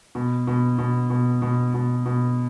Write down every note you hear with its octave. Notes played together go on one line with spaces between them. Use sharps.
B2
B2
B2
B2
B2
B2
B2